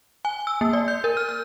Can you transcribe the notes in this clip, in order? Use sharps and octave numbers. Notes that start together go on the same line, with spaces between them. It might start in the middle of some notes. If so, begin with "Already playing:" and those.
G#5
E6
A#3
D5
G6
A#4
F6
F6